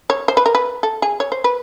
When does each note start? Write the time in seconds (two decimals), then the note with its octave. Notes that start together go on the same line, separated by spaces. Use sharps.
0.10 C#5
0.28 C5
0.37 B4
0.46 A#4
0.55 B4
0.83 A4
1.02 G#4
1.20 C#5
1.32 C5
1.44 B4